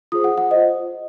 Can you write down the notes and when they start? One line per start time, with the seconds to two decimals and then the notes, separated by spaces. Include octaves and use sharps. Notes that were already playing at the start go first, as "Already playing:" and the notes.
0.12 F4 G#4 C5 D#6
0.24 F#5
0.38 F#5
0.51 F4 C5 D#5